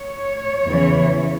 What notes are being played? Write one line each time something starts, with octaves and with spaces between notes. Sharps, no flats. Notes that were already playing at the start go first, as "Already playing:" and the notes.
Already playing: C#5
E2 C#3 E3